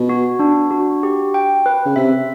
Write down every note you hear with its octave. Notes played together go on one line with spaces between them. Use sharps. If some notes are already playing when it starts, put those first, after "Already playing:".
Already playing: B2
F#4
D4
F#4
G4
G5
B4
C#3
C3 E5